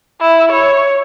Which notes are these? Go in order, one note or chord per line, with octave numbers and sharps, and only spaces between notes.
E4
C#5